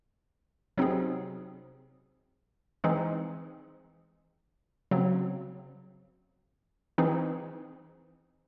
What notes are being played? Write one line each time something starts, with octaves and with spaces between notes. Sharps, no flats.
C3 F#3 C4 D#4 G#4
E3 G#3 C4 D#4 G#4
C#3 F#3 C4
E3 C4 D#4 G#4